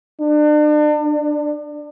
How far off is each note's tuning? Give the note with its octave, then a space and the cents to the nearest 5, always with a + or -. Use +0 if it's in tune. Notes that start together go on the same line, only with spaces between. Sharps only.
D4 +35
D4 +10